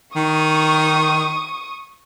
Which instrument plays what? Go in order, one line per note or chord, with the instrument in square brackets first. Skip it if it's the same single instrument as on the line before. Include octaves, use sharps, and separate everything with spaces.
[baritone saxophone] D#3 [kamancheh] C#6 D#6